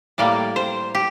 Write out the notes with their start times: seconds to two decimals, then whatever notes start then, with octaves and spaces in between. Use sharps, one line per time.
0.18 A2 G3 A#3 D5
0.56 C5
0.95 G4